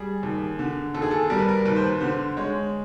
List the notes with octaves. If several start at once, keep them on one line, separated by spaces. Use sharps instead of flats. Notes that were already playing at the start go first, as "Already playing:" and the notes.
Already playing: G3 G#4
D#2
D3
D#2 A4
G#4
A4
G3 A#4
B4
A#4
D#2 B4
C5
B4
D3 C5
G#3 C#5